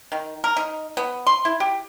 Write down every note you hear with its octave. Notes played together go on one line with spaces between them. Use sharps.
D#3
A#4
D#4
B3
C6
E4
G4